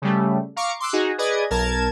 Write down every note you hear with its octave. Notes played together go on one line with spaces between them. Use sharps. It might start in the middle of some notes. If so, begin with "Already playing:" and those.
C#3 G3 A3
F5 A#5 C#6 D6
C6 D6 E6 F#6
D#4 F#4 G#4
G#4 B4 D5 D#5 G#6
B1 A#4 A5 G#6 E7